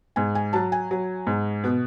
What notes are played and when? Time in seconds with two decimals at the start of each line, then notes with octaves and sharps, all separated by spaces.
0.16 G#2 G#5
0.35 G#5
0.53 F#3 A5
0.72 G#5
0.91 F#3
1.27 G#2
1.64 B2